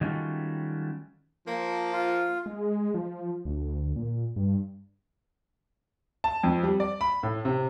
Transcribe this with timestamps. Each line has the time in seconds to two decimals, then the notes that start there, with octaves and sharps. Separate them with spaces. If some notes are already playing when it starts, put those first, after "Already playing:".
0.01 D#3 F#3 G3 A3 C#4 F4
1.47 F3 A#3
1.93 F4
2.46 G#3
2.94 F3
3.45 D2
3.96 A#2
4.36 G2
6.24 A5
6.43 F2
6.63 G3
6.80 D5
7.01 B5
7.23 A2
7.45 C3